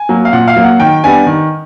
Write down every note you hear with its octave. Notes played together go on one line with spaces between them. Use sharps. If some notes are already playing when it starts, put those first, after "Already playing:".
Already playing: G#5
F#3 A#3
F5
A#2 F#5
F5
F#3 A#3
F#5
D#3 G5
G3 B3 D4 G#5
D#3